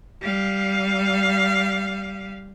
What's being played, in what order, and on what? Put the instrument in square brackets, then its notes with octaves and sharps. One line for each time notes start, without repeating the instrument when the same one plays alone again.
[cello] G3 F5